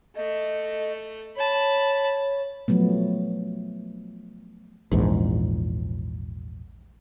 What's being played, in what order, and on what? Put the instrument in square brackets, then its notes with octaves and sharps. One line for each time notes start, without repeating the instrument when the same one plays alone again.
[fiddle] A3 [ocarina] D#5
[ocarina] C#5 [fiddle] A5 B5
[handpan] F3 F#3 A3 B3
[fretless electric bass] A#1 E2 G#2